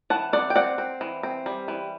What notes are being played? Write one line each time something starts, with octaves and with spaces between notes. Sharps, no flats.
E3 F#5 A5
C4 D5 F#5
G5
C4 D5 F#5
C4
E3
C4
G3
E3